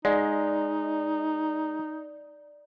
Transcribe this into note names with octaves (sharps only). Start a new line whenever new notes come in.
G#3 D#4 D5